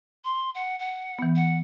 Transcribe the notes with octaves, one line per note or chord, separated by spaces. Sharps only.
C6
F#5
F#5
E3 B3
F#5